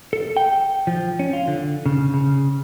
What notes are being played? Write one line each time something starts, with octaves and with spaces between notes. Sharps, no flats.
A4
G5
F3
C#4
F4
D3
C#3
C#3